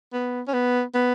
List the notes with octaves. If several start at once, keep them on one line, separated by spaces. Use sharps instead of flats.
B3
C#4
B3
B3